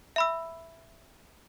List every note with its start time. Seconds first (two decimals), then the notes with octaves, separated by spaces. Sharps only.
0.16 E5 B5 E6